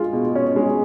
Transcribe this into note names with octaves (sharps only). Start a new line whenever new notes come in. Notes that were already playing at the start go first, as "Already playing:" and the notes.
Already playing: G#3 F4
B2
C#4
G#3